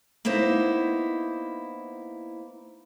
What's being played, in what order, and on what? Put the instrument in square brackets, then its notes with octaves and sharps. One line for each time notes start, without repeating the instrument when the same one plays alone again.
[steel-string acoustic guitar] A#3 B3 D#4 E4 C5